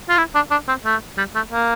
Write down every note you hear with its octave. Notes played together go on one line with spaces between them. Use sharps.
F4
E4
D4
D4
C4
A3
G3
A3
A#3